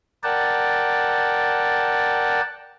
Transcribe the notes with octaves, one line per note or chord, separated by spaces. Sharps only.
A#4 D5 F#5 G5 A5